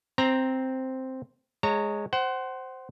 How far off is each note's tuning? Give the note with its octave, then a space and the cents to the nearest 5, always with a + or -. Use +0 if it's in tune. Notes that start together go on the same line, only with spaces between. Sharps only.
C4 +0 C5 +0 A#5 +0
G#3 +0 C#5 +0 A#5 -30
C5 +0 F#5 +30